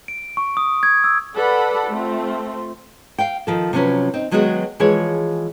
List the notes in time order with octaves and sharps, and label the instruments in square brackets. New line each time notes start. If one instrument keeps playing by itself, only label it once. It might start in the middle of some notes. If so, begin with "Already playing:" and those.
[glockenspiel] D7
C#6
D#6
G#6
E6
[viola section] A4 B4 D5 F#5 B5
A3 C4 F4
[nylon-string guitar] F5 G5
D#3 F3 A4
C3 F3 F#3 C4 C#4 B4
C4 D#4
D#3 F#3 G#3 B3 F#4 G#4
E3 F3 G#3 G#4 C#5